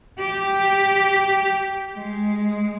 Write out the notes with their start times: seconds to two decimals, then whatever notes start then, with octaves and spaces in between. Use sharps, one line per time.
0.19 G4
1.96 G#3